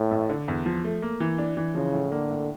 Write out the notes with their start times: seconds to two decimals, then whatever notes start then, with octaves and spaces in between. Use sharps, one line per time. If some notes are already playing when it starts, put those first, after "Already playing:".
Already playing: A2
0.11 A1
0.29 D3
0.48 E2
0.66 F3
0.84 A3
1.02 A#3
1.20 E3
1.38 D4
1.57 E3
1.75 C#3 F3
1.93 A2
2.12 D3 A#3
2.30 A2